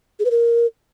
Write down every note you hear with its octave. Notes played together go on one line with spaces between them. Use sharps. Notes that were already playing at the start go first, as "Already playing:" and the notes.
G#4
B4
A#4